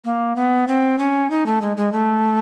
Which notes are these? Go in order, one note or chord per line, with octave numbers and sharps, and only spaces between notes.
A#3
B3
C4
C#4
D#4
A3
G#3
G#3
A3